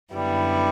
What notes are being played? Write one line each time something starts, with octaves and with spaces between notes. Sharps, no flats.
F#2 D3 G3 B3 E4